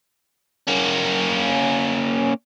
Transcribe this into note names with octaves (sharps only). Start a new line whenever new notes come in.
A#3 C#4